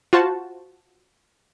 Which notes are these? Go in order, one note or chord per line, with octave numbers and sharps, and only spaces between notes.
F4 F#4 C5 A5